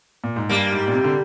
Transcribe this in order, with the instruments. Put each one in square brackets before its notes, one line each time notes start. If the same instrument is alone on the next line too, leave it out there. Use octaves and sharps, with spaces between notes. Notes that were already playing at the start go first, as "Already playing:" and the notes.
[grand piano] A#2
G#2
[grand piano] G2 [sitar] G3 A#3
[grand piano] G#2
A#2
C3
D3